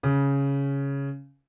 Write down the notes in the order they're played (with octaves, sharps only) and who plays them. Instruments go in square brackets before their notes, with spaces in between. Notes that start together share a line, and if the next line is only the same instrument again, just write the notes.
[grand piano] C#3